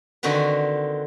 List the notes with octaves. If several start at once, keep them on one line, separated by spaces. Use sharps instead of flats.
D3 D#3 C4 F#4 B4